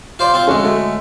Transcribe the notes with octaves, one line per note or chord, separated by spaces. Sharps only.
F4 C5 D5
C4 F4
D2 G#3 C#4 F#4 A4
A3